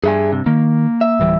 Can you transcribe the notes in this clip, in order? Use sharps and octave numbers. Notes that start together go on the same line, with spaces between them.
G2 G#4 E5 G#5
C3
D#3 A#3
E5
D1 E3 G3